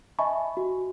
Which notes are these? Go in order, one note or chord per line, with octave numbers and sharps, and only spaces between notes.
D#5 E5 G#5 A5 B5 C#6
F#4